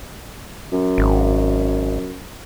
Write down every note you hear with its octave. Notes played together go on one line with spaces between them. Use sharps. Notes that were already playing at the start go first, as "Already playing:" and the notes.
F#2
G#1